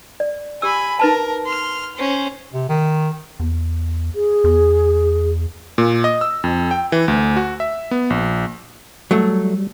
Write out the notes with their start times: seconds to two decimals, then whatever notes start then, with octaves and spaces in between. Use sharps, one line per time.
0.20 D5
0.62 G4 G#5 B5 E6
0.99 D#4 A#4 B4 A5
1.45 C6 F6
1.96 C#4 C5
2.54 C3
2.69 D#3
3.40 E2
4.15 G#4
4.44 E2
5.78 A#2
6.04 D#5
6.21 E6
6.44 F2
6.71 G5
6.92 E3
7.08 D2
7.36 F#4
7.60 E5
7.91 B3
8.10 A#1
9.11 F#3 G3 A3